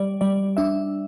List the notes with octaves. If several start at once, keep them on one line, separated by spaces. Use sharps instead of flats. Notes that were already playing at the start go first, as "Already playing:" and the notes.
Already playing: G3 D5
G3 D5
D4 E5